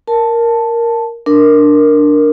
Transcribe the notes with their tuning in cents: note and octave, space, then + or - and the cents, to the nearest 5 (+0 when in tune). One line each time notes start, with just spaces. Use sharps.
A#4 +0 A5 +0
D4 +0 A#4 +0